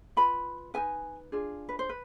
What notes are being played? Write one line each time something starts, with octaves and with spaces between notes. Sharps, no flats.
F4 B4 B5
D#4 G#4 B4 G#5
D4 F4 G#4
B4
C5
B4